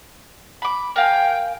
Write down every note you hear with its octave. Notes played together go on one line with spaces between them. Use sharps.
B5 D6
A#4 F5 G5 G#5